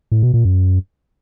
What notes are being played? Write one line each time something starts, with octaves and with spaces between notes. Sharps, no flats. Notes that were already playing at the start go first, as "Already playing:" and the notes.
A2
B2
A#2
F#2